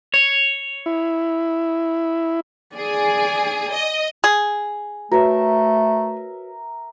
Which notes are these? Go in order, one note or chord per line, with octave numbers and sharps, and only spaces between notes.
C#5
E4
G#4 D5 G#5
D#5
G#4
A3 F#4 A#4 B4 C#5 E5